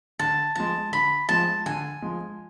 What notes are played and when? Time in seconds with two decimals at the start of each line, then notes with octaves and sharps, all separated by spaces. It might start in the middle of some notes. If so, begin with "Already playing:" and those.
0.19 D3 A5
0.55 F3 G#3 A5
0.92 D3 B5
1.29 F3 G#3 A5
1.66 D3 G#5
2.02 F3 G#3